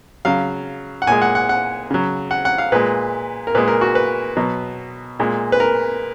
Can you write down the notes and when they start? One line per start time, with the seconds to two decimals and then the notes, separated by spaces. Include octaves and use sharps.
0.25 C#3 F#3 F5
1.02 F#5
1.07 A#2 G#3 G#5
1.22 F#5
1.35 F#5
1.49 F#5
1.91 C#3 F#3
2.31 F#5
2.45 F#5
2.58 F5
2.72 A#2 G#3 B4
3.47 A#4
3.55 A#2 G#3 B4
3.68 A#4
3.81 F#4
3.95 B4
4.37 B2 F#3
5.20 A#2 G#3
5.52 B4
5.60 A#4